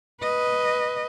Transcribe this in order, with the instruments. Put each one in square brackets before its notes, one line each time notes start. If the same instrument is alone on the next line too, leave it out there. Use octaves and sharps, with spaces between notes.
[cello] B4 D#5